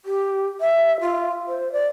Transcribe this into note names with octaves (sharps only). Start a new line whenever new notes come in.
G4
E5
F4
C5
D5